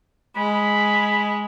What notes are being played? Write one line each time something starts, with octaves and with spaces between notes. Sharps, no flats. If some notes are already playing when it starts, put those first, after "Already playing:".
G#3 B5